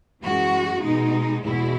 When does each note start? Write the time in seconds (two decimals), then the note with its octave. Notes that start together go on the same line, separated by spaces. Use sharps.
0.22 F#2 E3 G#3 F#4
0.83 B2 G#3 D#4
1.43 E2 B2 G#3 E4